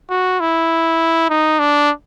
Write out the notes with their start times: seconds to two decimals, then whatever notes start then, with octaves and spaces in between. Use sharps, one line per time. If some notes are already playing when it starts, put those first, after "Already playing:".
0.10 F#4
0.40 E4
1.30 D#4
1.60 D4